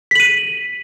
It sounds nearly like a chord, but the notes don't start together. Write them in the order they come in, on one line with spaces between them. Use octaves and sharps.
B6 F#7 D#7